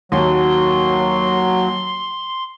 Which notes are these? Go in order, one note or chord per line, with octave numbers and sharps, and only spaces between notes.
D#2 F#3 C6